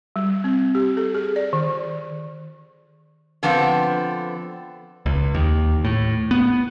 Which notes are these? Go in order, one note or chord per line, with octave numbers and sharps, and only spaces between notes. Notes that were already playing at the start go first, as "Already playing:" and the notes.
G3
C4
G4
A4
G#4
D5
D#3
D3 F3 B3 C4
C#2
D#2
A2
B3